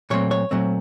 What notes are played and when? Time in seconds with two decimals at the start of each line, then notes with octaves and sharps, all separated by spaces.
0.10 A#2 F#3 A3 C4 C#5
0.31 C#5
0.51 A#2 F#3 A3 C4